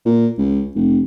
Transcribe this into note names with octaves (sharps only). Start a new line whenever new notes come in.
A#2
C#2
F1